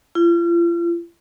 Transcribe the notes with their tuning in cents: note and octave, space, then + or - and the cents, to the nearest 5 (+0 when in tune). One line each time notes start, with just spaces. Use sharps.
F4 -40